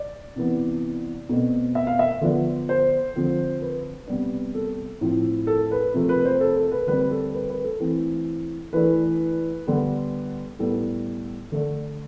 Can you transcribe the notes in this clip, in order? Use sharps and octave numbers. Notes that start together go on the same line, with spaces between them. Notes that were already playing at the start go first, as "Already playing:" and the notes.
Already playing: D5
C3 E3 B3
B2 A3 C4
E5
F5
E5
D3 F3 B3 D4
C5
D3 F3 C4
B4
C3 G3 B3 D4
A4
A2 F3 C4
A4
B4
C3 F3 A3
B4
C5
A4
A4
B4
D3 G3 C4 B4
A4
B4
B4
A4
E3 A3 C4
E3 A3 D4 B4
D3 G3 B3
A2 G3 B3 A4
D3 A3 D4